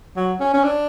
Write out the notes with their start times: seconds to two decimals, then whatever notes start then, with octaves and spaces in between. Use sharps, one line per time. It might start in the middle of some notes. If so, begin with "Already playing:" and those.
0.16 F#3
0.40 C#4
0.54 C#4
0.64 D4